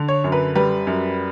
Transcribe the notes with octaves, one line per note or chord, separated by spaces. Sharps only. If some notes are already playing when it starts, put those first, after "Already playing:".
Already playing: D3
C#5
F#2
B4
G3 B4
F#2